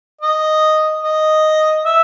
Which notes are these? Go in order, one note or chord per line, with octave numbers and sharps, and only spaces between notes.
D#5
D#5
E5